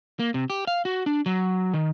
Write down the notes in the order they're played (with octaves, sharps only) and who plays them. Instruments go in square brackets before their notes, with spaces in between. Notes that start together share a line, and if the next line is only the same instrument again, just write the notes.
[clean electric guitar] A#3
C3
G4
F5
F#4
D4
F#3
D#3